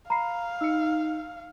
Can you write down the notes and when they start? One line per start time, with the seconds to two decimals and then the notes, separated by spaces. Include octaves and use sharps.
0.10 F5 A#5 B5 C7
0.61 D#4 E6 C#7